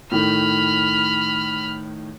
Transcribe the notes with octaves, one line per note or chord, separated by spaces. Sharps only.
A2 D#3 B5 F6